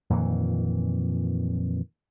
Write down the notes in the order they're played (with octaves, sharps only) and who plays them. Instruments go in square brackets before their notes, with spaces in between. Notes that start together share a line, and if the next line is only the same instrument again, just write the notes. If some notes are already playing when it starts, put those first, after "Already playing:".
[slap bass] F2 A#2 D#3 E3